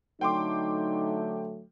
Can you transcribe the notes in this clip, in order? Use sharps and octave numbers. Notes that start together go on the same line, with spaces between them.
D3 F#3 A3 D#4 G5 C6 D6